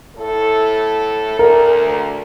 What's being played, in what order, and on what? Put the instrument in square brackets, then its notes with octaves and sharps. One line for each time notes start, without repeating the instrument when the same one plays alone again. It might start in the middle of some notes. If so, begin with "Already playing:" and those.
[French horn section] A2 A4
[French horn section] D2 [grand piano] A#4